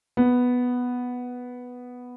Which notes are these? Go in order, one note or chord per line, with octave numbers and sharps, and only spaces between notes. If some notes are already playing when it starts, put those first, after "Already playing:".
B3